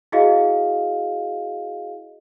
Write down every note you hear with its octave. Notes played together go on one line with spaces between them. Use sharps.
E4 F#4 G#4 D#5 F5